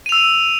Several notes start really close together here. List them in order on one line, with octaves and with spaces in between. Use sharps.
D#7 F7 E6